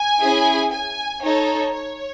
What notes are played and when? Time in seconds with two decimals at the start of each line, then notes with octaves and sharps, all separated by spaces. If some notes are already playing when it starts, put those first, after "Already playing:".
Already playing: G#5
0.21 C#4 E4 G#4
0.72 G#5
1.22 D#4 A4 C#5
1.73 C#5